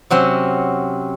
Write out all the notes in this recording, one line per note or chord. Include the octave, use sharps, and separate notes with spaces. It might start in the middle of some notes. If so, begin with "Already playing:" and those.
C3 F#3 C4 C#4